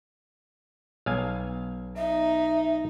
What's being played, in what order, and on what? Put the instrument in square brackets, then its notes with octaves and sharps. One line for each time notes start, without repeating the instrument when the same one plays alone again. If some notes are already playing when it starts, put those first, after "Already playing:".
[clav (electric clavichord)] B1 F5 G#5
[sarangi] D#4 [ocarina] E5